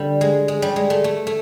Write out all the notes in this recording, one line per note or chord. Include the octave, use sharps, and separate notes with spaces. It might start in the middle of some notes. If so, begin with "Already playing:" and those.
Already playing: D3 G3
G#3
G#3
G3
G#3
A3
A3
A3